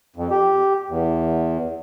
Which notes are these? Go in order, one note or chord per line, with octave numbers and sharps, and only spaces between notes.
F2
G4
E2